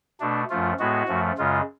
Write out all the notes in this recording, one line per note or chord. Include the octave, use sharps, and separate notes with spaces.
B2 A3 D4
F#2 F3 A3 F4
A2 G#3 B3 F#4
F#2 F3 A3
F#2 C#3 G#3 F4